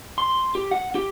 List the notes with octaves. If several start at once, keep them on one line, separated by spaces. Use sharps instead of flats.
C6
G4
F#5
G4